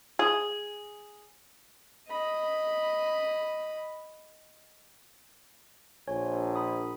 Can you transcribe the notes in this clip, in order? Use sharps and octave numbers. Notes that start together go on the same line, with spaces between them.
G#4
D#5 B5
A#1 C#5 G#5
B5 D#6